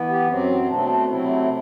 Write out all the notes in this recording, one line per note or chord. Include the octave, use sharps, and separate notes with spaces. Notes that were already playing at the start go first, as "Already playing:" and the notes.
Already playing: E3 B3
G4
F#2 F#3 C4
B2 A3 C4 D4
C3 F#3 A3 C4 E4
E4